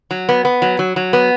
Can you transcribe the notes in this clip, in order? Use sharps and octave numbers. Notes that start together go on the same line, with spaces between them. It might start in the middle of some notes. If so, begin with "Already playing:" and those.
F#3
B3
B3
F#3
F#3
F#3
B3